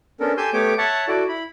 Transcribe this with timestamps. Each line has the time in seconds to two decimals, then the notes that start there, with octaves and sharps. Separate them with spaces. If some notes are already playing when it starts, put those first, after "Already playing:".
0.20 B3 C#4 D4 A4 A#4
0.37 G4 A4 G#5 C6 E6 G6
0.53 A3 B3 G4 C#5 D6
0.78 C#5 E5 F#5 A5
1.08 E4 F#4 A4 D5
1.28 E4 B5